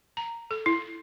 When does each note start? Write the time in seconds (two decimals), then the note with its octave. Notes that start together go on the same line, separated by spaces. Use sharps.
0.17 A#5
0.51 A4
0.66 E4